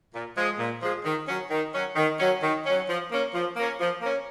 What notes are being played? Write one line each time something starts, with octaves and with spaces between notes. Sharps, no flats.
A#2
F3 G#3
A#2
F3 G#3
D#3
F#3 C#4
D#3
F#3 C#4
D#3
F#3 C#4
D#3
F#3 C#4
F3
A#3 C#4
F3
A#3 C#4
F3
A#3 C#4